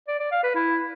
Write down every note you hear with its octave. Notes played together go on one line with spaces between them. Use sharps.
D5
D5
F5
B4
E4